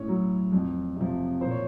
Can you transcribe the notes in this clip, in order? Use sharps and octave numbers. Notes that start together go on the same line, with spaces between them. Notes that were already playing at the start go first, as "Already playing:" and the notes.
Already playing: A2 C#4 C#5
F#3
F2
C3 F3
A#2 C5
C#5